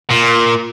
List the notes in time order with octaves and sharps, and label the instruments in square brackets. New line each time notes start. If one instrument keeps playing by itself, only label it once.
[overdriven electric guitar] A#2